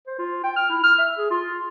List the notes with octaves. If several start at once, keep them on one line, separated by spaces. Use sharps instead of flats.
C5
F4
G5
F6
E4
F6
E5
G#4
F4